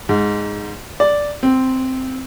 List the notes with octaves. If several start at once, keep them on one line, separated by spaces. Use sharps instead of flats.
G#2
D5
C4